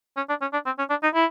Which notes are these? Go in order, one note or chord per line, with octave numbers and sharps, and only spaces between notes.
C#4
D4
C#4
D4
C4
C#4
D4
D#4
E4